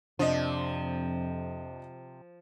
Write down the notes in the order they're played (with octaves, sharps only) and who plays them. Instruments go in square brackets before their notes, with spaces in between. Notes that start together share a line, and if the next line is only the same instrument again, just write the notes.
[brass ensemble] F2 [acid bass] C3 [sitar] F3 [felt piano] D4 D#5